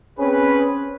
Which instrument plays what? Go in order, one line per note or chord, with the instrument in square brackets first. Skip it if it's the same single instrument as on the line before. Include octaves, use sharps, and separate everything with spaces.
[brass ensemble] C4 C#4 G#4 B4